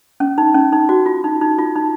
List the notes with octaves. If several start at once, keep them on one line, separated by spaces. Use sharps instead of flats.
C#4
D#4
C#4
D#4
F#4
F4
D#4
D#4
F4
D#4